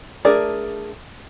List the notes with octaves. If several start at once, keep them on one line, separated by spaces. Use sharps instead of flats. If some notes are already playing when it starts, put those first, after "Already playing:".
A3 D4 G#4 A#4 D5